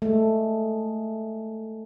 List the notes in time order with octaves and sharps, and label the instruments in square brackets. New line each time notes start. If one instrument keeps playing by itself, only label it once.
[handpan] G#3 A3